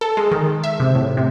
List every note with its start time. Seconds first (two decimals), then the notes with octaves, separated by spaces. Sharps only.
0.01 A4
0.17 G#3
0.31 D#3
0.64 E5
0.80 C3
0.95 A2
1.17 C3